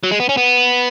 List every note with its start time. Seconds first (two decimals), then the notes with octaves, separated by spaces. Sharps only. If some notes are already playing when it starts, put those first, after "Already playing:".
0.03 F#3
0.11 G#3
0.20 B3
0.29 C#4
0.37 B3